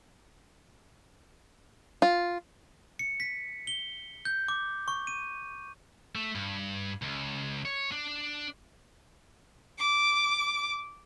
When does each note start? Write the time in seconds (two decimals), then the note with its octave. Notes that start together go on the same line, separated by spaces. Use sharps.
2.02 F4
2.99 C#7
3.20 B6
3.67 G7
4.25 G6
4.48 D6
4.88 C#6
5.07 D#7
6.15 A3
6.35 G2
7.02 C#2
7.65 C#5
7.92 D4
9.79 D6